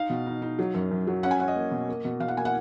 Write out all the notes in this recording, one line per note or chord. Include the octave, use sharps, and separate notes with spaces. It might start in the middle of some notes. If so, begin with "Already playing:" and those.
Already playing: D#4 F5
B2
D#4
D#4
F#3
F#2
F#2
F#3
C#4 F#5
G#5
C#4 F#5
D#5
A#3
B2
A#3
B2
B2 F5
F#5
A#3 G#5
F#5